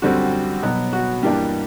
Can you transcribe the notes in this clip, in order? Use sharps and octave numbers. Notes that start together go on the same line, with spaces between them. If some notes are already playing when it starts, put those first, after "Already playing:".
F#2 D3 G3 C4 F#4
B2 F#3 B3
F#4
G2 E3 G3 A#3 D4 G4